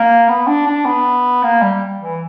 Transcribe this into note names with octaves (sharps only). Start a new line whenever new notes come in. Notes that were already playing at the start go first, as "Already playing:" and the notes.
Already playing: A#3
B3
D4
D4
B3
A#3
G3
E3